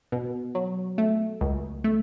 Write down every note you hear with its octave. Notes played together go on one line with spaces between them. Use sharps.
B2
F#3
A3
C#2
A3